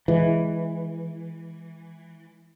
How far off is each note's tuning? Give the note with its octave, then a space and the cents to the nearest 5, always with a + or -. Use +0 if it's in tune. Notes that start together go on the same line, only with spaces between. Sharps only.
E3 +0 G#3 +0